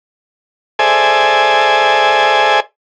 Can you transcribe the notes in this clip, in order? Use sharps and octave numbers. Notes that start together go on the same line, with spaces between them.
G#4 A4 C5 D5 E5 G#5